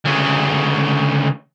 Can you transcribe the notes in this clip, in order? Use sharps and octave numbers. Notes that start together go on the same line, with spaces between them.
D2 C#3